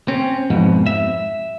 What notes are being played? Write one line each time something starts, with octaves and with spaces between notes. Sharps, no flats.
C4 C#4
F2 G#2 B2
E5